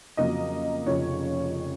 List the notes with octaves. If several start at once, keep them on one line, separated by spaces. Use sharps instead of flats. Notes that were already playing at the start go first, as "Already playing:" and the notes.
F2 C#3 F#3 A#3 D#5
F1 F2 C#3 F3 C#5